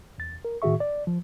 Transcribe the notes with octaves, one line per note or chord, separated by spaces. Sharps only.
E2 A6
A#4
A2 D#3 F#4 G#4 E5 C#6
D5
F3